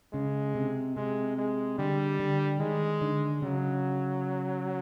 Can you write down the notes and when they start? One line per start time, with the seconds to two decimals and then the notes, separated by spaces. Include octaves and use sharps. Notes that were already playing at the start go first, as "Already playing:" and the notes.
0.13 C#3 G#3
0.55 C3
0.96 C3 G#3
1.37 G#3
1.78 D3 G3
2.20 D3
2.60 D#3 G#3
3.02 D3
3.42 C#3 F#3